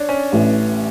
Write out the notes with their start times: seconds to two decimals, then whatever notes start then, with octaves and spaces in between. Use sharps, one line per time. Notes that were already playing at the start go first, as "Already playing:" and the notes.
Already playing: D4 C#5
0.09 C#4
0.32 A1 A2 E3